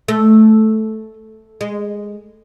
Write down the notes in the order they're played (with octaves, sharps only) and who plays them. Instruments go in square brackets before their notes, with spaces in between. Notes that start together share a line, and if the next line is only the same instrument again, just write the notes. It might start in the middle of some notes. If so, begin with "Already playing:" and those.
[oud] A3
G#3